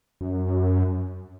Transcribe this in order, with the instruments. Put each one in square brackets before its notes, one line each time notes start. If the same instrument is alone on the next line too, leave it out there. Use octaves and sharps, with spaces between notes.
[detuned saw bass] F#2